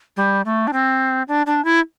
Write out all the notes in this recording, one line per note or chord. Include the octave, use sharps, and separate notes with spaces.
G3
A3
D4
C4
D4
D4
E4